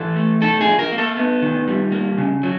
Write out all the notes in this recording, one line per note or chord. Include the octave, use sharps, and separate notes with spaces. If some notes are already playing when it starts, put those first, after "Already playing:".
Already playing: E3 A4
A3
D#4 A4
G#4
F3
A#4
A#3
A4
B3
D#3
G3
A#3
C#3
F#3